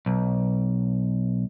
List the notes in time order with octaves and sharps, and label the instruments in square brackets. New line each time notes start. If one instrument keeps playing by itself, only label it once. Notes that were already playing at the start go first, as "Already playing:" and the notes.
[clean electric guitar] B1